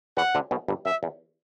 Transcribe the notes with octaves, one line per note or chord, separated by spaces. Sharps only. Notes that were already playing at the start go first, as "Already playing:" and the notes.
E2 E3 F#5
D2 D3
B1 B2
G1 G2
F#2 E5
E2